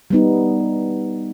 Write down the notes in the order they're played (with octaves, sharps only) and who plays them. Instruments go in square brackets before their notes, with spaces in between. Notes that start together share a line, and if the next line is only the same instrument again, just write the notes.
[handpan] G3 B3 D#4